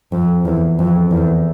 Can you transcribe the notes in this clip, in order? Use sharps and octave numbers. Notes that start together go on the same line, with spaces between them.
F2
E2
F2
E2